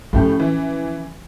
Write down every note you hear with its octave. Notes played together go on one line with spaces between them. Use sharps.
A2 F3 A3 C#4 G4
E3